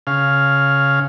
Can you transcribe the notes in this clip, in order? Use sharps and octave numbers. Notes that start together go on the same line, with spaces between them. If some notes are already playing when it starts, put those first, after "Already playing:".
C#3 F5